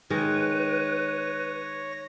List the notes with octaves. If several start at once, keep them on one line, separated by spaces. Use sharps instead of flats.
D#3 G#3 B4 C#5 A#6